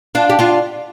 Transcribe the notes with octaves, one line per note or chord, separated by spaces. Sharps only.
D4 F4
G4
D4 F4